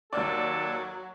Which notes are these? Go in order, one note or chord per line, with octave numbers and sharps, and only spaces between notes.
D#2 F#3 A4 D5